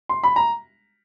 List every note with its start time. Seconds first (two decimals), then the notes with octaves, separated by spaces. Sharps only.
0.09 C6
0.23 B5
0.36 A#5